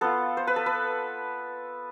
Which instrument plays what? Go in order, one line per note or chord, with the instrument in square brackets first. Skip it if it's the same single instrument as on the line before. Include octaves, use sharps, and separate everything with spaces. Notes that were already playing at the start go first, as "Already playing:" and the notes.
[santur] B3 F4 A4
C5
B4
A4
B4